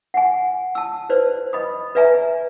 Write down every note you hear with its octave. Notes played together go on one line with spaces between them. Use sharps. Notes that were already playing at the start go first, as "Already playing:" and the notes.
F#5 G#5
A5 E6
B4 C5 D5
D#5 B5 D#6
B4 D5 E5 G#5 A#5